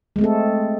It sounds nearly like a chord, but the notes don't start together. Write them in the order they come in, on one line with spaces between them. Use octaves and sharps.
G#3 A3 C4 A4